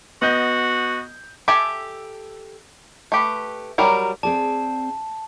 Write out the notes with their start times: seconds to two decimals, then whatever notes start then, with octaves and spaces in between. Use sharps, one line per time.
0.22 B3 F#4 D#5 G6
1.48 G4 A4 E5 G#5 A5
3.12 A3 G4 B4
3.78 F#3 G3 A#4
4.23 C4 G#4 D5 A5